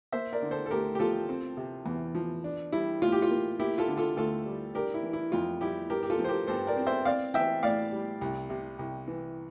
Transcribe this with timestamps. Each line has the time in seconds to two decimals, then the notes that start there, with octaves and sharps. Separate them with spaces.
0.12 A#3 C5 E5
0.32 A#4 D5
0.42 D3
0.51 A4 C5
0.66 A4
0.71 D2 G4 A#4
0.95 G4
0.99 F3 F4 A4
1.29 C4
1.57 C3
1.86 E2
2.15 F3
2.44 D4
2.72 G3 E4
3.02 A2 F4
3.12 G4
3.22 F4
3.31 A#3
3.59 A#3 E4 G4
3.78 F4 A4
3.88 D3
3.97 F4 A4
4.17 D2 F4 A4
4.46 G3
4.75 D4 G4 A#4
4.94 E4
5.03 E3
5.13 E4
5.32 F2 F4
5.61 G3 E4 G4
5.90 G2 G4 A#4
6.03 G4
6.10 F4 A4
6.19 F3
6.24 C5
6.29 G4 A#4
6.47 G2 A4 C5
6.67 A#4 D5
6.76 C4
6.87 C5 E5
7.05 C4 D5 F5
7.34 E3 E5 G5
7.63 A2 D5 F5
7.92 G3
8.21 C2
8.50 C3
8.79 C2
9.07 E3